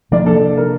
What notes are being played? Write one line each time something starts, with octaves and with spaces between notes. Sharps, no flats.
C3 F3 A#3 D4 D5
A4
A#4